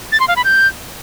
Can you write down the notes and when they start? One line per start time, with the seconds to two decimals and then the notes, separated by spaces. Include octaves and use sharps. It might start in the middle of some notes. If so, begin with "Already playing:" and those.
0.12 A6
0.20 C6
0.28 F5
0.36 B5
0.44 G6